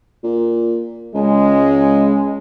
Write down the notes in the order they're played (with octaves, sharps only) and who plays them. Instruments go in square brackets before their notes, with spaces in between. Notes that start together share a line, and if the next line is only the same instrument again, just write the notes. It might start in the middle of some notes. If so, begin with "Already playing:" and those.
[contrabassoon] A#2
[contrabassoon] C#2 [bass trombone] G#3